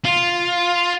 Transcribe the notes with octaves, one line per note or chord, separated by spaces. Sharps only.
F4